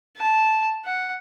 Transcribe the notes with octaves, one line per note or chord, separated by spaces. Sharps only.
A5
F#5